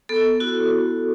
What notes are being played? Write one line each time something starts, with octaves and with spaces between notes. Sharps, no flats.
B3 A4
E4 F#4